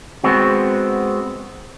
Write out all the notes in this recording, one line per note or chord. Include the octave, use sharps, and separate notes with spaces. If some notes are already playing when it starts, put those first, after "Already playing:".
G#3 B3 C4 F#4